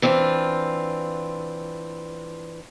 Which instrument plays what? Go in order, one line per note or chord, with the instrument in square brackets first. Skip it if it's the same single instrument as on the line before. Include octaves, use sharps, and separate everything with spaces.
[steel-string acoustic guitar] E3 C4 D4 F4